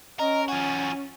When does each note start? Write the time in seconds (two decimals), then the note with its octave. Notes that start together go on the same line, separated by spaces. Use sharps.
0.20 C#4 A#4 D#5
0.48 F3 F#4 G#5